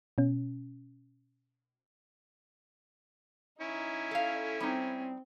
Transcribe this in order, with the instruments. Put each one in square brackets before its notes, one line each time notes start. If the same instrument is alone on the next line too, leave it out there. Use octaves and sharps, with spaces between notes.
[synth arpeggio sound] B2 C#4
[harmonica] C#4 E4 [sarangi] D#4
[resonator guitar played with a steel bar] A4 F5
[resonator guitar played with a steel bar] G3 D#4 [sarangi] C4